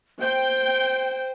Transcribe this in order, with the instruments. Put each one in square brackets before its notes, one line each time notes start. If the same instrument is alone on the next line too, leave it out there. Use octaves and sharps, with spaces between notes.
[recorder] C5 [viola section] G5 [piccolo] G6